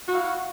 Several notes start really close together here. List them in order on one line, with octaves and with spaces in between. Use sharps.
F#4 E4 F5